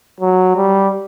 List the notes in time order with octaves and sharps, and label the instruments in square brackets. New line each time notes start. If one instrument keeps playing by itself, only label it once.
[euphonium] F#3
G3